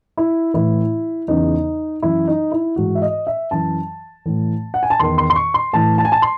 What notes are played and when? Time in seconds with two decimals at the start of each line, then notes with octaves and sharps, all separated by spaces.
0.17 E4
0.54 A2 E3 E4
1.28 E2 C#3 E3 D#4
2.02 F#2 E3 E4
2.28 D#4
2.51 E4
2.76 G#2 E3 F#4
2.95 E5
3.02 D#5
3.27 E5
3.51 F#2 E3 A5
4.26 A2 E3
4.74 F#5
4.83 G#5
4.90 A5
5.00 E2 D#3 C6
5.18 C6
5.30 C6
5.36 C#6
5.54 C6
5.73 A2 E3 A5
5.98 A5
6.05 G#5
6.12 A5
6.22 C6